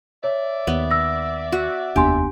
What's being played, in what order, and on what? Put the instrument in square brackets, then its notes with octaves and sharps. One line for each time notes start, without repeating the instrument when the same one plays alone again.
[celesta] C#5 [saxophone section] D5 E5
[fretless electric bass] D#2 [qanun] B3
[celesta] E6 A#6
[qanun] F#4
[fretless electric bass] F1 D#2 B3 [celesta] D4 G#5 C6 [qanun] G4